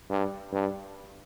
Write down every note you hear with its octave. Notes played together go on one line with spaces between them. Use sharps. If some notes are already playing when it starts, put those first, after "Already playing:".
G2
G2